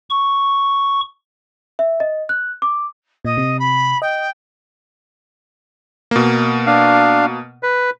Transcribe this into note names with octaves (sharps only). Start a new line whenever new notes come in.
C#6
E5
D#5
F#6
D6
A#2 D#5
C3
B5
D#5 G5
B2 A#3
D4 F5
B4